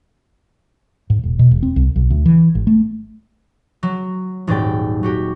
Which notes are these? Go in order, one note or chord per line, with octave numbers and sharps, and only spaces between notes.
G#2
E1
B2
E1
C4
C2
B1
D2
E3
G#1
A3
F#3
D#1 G#2 F#3 D5 G5
F#3 F#4 G4